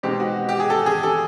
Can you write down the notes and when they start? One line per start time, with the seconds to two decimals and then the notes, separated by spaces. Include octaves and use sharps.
0.03 B2 G#3 C4 D#4 G4
0.20 F#4
0.49 G4
0.60 G#4
0.70 A4
0.86 G#4
1.03 A4